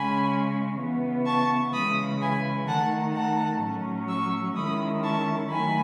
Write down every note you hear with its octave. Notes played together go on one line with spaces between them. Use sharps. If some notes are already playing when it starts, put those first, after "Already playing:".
Already playing: C#3 G#3 C#4 G#5 B5
C#3 E3 B3
A5 C#6
C#3 E3 G#3 B5 D#6
G#5 B5
D#3 A3 D#4 F#5 A5
F#5 A5
A2 F#3 C#4
C#6 E6
D#3 G#3 C#4 E4 B5 D#6
A5 C#6
D#3 F#3 A3 G#5 B5